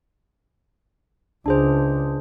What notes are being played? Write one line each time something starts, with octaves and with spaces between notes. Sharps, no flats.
C#2 D4 G#4 C5